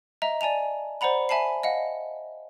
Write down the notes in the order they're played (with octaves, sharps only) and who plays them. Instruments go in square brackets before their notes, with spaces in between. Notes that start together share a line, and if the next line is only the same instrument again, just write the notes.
[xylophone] D#5 E5 A#5
D5 G#5 A5 F7
C5 D5 F#5 A#5 B5
E5 G#5 A5 B5 C7
D#5 F5 F#5